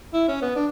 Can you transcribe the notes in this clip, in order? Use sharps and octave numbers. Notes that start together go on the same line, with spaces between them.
E4
C#4
B3
D4